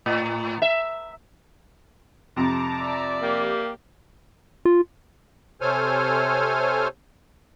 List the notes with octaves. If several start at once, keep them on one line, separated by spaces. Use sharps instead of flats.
A2
E5
F2 C3 A5 A#5 D6
D5 E5
A#3 G4
F4
C3 A4 C5 C#5 G#5 F6